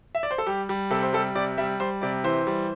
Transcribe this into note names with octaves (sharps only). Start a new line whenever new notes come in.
E5
D5
C5
A4
G3 G4
G3
C3 A4
C5
G3 A4
C3 D5
G3 E5
G3 C5
C3 D5
E3 C5
G3